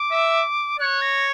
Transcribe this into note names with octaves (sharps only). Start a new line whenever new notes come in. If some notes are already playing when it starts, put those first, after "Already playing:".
Already playing: D6
E5
C#5 F#6
A#6